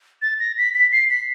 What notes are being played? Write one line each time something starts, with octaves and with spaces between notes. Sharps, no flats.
A6
A#6
B6
B6
C7
B6